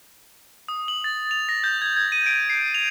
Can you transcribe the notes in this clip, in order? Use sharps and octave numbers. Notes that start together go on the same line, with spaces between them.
D#6
F#7
A6
F7
A#6
G6
G#6
G#6
D#7
D7
C7
F7